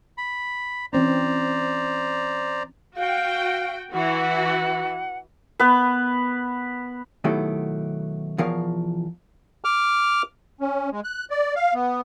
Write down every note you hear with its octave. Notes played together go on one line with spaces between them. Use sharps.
B5
E3 C4 C#4 C5 D5 A#5
F#4 F5 G5
E3 F#4 F#5
B3 B4
B2 D#3 F#3 A3 E4 G4
E2 B2 F3 A#4 C#5 F5
D6 F6
C#4
G#3
F#6
D5
F5
B3